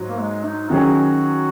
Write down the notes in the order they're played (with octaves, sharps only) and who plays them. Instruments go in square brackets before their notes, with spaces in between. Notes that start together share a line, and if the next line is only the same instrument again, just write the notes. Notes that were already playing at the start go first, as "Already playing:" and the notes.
Already playing: [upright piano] G#2 F#3
[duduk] A#3
G#3
D#4
[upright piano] D#3 F#3 C#4 G#4 [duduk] F#4